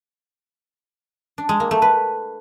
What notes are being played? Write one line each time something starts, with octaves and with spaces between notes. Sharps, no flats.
D4
G#3
A#3
A3
B4